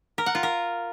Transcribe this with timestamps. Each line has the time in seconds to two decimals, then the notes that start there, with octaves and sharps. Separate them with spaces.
0.18 A#4
0.26 F#5
0.35 F4
0.43 A#4